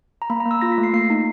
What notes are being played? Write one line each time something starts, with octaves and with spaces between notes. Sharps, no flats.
A#5
A#3 B5
A#5
A#3
E6
F4 A#6
B6
A3
C7
A#3 C7
D#4 C7